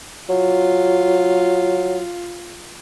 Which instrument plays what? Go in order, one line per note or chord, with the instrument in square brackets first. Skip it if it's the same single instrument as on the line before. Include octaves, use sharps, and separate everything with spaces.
[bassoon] F#3 [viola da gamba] F4